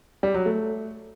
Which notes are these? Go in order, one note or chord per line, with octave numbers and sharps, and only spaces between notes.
G3
F#3
A3